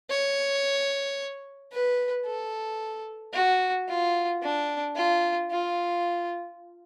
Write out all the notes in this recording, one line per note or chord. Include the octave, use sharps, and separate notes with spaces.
C#5
B4
A4
F#4
F4
D4
F4
F4